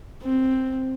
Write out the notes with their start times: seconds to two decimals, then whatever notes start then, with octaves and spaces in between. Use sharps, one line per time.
0.22 C4